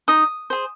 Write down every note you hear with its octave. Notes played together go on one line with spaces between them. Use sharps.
D#4 D#6
G#4 C5